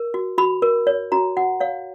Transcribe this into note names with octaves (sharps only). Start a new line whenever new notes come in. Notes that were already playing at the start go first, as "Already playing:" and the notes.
Already playing: A#4
F#4
F#4 B5
A#4
C#5
F#4 A#5
F#4 F#5
C#5 F5